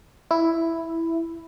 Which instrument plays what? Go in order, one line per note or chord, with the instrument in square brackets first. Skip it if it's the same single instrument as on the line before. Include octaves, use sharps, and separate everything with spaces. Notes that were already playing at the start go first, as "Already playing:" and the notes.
[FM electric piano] E4